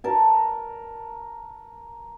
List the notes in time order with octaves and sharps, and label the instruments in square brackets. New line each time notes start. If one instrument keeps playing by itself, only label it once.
[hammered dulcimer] A#4 A5